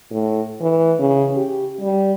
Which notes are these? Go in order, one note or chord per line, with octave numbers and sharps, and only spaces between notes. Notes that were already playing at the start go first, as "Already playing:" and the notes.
A2
E3
C#3
G4
G3